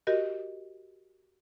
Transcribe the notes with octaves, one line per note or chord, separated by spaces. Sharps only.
F#4 G4 A#4 D#5